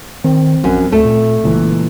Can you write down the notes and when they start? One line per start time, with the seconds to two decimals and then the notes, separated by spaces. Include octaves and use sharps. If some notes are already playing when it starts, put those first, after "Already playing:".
0.24 D#3 C4
0.64 A#1 F#2
0.92 D2 A3
1.05 A#2
1.44 F#1 C#2 A#2 E3